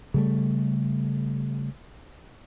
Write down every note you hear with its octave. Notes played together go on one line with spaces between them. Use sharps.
C#3 G3 A3